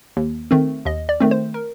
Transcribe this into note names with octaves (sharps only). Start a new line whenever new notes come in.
D#2
D#3 A3 C4
D#2 D#5
D5
D#3 A3 C4
C5
A#4